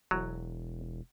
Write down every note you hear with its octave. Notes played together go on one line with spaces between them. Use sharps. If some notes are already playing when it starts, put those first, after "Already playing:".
E1 F#3